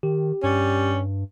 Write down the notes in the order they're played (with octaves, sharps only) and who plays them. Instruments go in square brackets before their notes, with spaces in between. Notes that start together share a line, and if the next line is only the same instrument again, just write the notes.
[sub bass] D#3 [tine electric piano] G4
[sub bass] G2 [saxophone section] G3 C#4